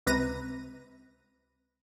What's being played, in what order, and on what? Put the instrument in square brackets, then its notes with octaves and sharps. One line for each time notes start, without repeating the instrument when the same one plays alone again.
[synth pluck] C#2 C3 B4 A#5 A#6 D#7